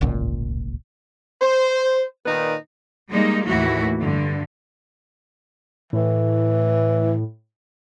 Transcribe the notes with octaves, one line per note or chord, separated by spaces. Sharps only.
D1 G#1 C#2 A#2
C5
A#2 D#3 D#4 B4 D5
G3 G#3 A#3 D#4
D#2 A2 E3 E4 F#4
G2 D3
A2 E3